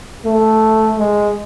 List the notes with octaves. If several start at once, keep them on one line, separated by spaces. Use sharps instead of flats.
A3
G#3